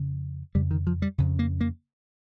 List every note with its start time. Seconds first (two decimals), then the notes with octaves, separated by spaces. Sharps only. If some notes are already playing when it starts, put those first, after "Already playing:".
Already playing: F2 C#3
0.55 F2 C#3 G3
0.71 D#3
0.87 F3
1.02 G3
1.18 F2 C#3
1.39 A#3
1.61 A#3